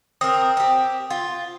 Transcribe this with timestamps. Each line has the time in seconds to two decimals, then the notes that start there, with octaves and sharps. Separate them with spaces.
0.21 C4 A#4 D#6
0.57 C4 G4
1.10 F4